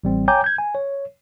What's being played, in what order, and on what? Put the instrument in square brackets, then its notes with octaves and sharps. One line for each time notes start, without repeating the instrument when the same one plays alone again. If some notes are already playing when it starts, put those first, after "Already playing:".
[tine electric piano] A1 G3 C4
C#5 G5 G#5 A#5 D6 G6
G6 G#6
G#5
C#5